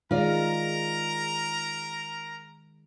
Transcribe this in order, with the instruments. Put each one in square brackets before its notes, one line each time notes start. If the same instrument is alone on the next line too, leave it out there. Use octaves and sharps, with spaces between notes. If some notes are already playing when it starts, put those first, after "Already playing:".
[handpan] D#3 G#3 [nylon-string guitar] F4 D5 [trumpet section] A#4 A#5